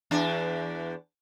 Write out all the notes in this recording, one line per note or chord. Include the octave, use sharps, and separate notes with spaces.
E2 D4